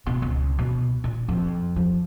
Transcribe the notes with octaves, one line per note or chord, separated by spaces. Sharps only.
B2
C#2
B2
A#2
F2
F3